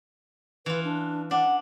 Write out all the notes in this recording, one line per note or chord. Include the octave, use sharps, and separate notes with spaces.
E3 F4 B4
D4
D4 F#5